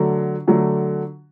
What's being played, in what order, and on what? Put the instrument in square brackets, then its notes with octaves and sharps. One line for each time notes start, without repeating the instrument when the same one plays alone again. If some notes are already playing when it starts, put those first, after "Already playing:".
Already playing: [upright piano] D3 F#3 A3
D3 F#3 A3